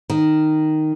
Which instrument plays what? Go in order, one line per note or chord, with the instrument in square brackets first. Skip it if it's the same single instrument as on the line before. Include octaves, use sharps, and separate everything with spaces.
[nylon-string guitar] D#3